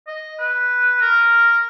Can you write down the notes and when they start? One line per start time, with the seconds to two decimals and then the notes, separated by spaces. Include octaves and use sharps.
0.07 D#5
0.39 B4
1.01 A#4